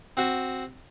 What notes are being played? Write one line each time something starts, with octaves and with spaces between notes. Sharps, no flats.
C4 F#4